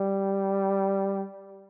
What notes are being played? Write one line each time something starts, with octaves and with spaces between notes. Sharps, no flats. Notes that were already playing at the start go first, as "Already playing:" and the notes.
Already playing: G3